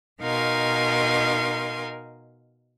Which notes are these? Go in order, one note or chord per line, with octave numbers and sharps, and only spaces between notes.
B2 D#4 A#4 F5 G#5 C6